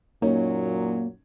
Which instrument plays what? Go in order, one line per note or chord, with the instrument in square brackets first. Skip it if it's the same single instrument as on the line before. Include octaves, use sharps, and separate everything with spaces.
[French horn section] F#2 A#2 F#3 [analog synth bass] A#3 [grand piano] C#4 D#4